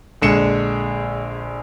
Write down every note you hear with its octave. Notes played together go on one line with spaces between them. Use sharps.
A#1 D3 G#3 C#7 E7